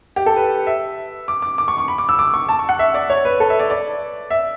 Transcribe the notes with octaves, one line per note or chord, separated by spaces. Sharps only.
G4
A4
B4
E5
D6
D6
D6
C#6
C#6
B5
D6
E6
D6
C#6
A5
C#6
F#5
E5
D5
C#5
B4
A4
E5
D5
D5
E5